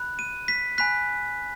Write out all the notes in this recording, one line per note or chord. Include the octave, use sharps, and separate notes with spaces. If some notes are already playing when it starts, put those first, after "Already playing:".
Already playing: B5 F#6
D#7
B6
G#5 B5 F#6 B6